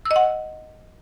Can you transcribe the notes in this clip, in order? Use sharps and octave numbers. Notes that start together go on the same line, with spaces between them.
E6
D#5
F#5